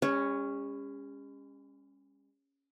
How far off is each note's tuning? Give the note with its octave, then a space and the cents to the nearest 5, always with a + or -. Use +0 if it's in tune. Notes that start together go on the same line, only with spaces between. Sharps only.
G#3 -45 C#4 +0